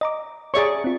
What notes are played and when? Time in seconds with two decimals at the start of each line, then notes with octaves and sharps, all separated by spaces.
0.01 D#5 A#5 D6
0.54 G#4 C#5 D5 E5 A#5 C#6
0.84 C4 F4